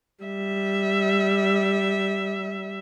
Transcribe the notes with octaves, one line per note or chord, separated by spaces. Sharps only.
G3 E5